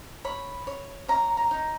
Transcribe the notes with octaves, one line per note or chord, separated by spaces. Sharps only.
C#5 B5
C#5
C#5 A#5
A#5
D#4